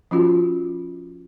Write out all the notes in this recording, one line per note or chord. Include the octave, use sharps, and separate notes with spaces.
F3 C#4 F4 F#4